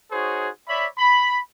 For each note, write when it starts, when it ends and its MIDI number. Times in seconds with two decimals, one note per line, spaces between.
0.12 0.49 63
0.12 0.49 66
0.12 0.49 68
0.12 0.49 72
0.12 0.49 73
0.69 0.87 73
0.69 0.87 74
0.69 0.87 76
0.69 0.87 83
0.99 1.39 83